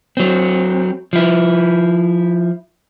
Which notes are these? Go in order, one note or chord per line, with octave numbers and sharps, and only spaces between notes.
F#3 C4
F3 E4